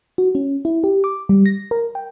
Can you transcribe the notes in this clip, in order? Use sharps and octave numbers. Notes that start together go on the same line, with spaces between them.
F#4
C#4
E4
G4
D6
G3
A#6
A#4
G5